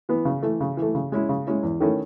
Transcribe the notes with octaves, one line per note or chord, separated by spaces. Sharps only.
E3 B3
C#3
E3 A3
C#3
E3 A3
C#3
G#3 C#4 E4
C#3
G#3 C#4 E4
E2
D#3 A3 C#4 E4